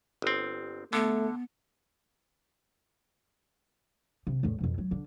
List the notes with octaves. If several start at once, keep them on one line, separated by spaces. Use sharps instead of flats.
G1 C4
D3 A3 B3
C3
E2 A2
F2 B2
F#3
D3